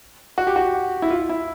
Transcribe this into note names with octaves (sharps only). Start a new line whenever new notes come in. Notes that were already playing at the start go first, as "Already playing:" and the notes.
F#4
G4
F#4
E4
F4
E4